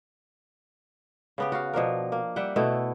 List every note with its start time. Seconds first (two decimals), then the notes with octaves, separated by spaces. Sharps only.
1.38 C#3 B3 G4
1.52 F#4 F5
1.73 B2 F3 D4 A#4
2.12 A#3
2.36 G3 E5 F#5 G5
2.56 B2 A3 E4